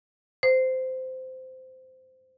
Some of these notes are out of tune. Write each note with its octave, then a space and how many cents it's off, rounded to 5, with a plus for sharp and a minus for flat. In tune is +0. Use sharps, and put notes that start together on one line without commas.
C5 -15